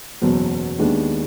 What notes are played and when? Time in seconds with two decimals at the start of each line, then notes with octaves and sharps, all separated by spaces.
0.21 F#1 E2 B2 F#3
0.79 D#2 D#3 G#3 B3 D4